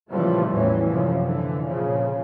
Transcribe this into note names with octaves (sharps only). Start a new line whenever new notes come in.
A#2 C#3 E3 F3 G3 A3
A1 E2 A2 E3 F#3 C#4
F#2 C3 F3
D3 E3
A#2 C#3 F3